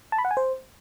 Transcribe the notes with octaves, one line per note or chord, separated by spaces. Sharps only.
A5
B5
F#5
G#5
C5